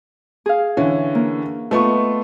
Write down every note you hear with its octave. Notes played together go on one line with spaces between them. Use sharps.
G#4 F5
D3 E3 C#4
A#3
A3 B3 D#4 F4 C#6